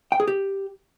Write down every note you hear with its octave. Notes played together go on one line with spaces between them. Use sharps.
G5
G#4
G4